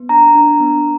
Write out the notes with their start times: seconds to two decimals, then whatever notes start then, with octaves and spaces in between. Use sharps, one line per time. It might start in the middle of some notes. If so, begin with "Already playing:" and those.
Already playing: B3
0.09 D4 A#5
0.35 D4
0.60 B3